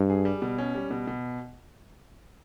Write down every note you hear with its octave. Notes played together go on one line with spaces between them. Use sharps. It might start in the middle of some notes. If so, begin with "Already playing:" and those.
Already playing: G2
G#4
G3
B2
C#4
G3
B2
B2